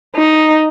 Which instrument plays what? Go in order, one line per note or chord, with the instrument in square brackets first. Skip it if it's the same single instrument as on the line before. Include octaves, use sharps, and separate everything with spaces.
[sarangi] D#4